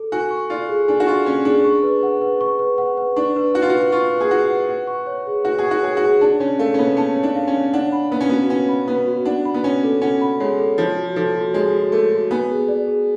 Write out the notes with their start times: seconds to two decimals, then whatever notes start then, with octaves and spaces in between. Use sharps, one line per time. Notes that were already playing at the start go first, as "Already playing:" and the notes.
Already playing: A4
0.12 F#4 G#5
0.31 C#6
0.50 F4 D5
0.69 G#4
0.88 D4 G#5
1.00 F#4
1.07 F4 C#6
1.26 C#4 D5
1.45 D4 G#4
1.64 C#6
1.83 B4
2.03 F#5
2.21 B4
2.41 C#6
2.59 B4
2.78 F#5
2.97 B4
3.16 D4 C#6
3.36 B4
3.54 F#4 F#5
3.62 F4
3.70 F#4 B4
3.92 F4 C#6
4.12 B4
4.20 G#4
4.31 F#4 F#5
4.49 B4
4.69 F#5
4.87 C#6
5.06 C#5
5.27 G#4
5.45 F#4 F#5
5.58 G#4
5.64 C#6
5.71 F#4
5.83 G#4 C#5
5.97 F#4
6.03 G#4
6.21 D4 A5
6.40 C#4 C#5
6.59 A3 F5
6.74 C#4
6.79 B3 C#5
6.97 C#4 A5
7.16 C#5
7.23 D4
7.36 F5
7.47 C#4
7.55 C#5
7.73 D4 F#5
7.92 B5
8.11 B3 B4
8.20 C#4
8.29 B3 F#4
8.49 C#4 F#5
8.69 B5
8.87 B3 B4
9.07 F#4
9.25 D4 F#5
9.45 B5
9.54 B3
9.64 C#4 C#5
9.83 A4
10.02 C#4 F#5
10.21 B5
10.40 G#3 C#5
10.58 A4
10.78 F3 C#5
10.97 F#4
11.16 F3 A4
11.35 F#4
11.54 G#3 C#5
11.73 F#4
11.92 A3 A4
12.12 F#4
12.31 B3 G#5
12.50 G#4
12.68 D5
12.88 G#4